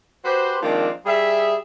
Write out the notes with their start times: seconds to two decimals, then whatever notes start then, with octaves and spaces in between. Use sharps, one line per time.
0.25 F#4 G4 B4 C5
0.62 D#3 F3 G#3 A#3 C4 D4
1.06 G3 G#4 E5